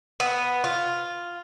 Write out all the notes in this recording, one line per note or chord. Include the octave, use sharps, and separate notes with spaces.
B3
F4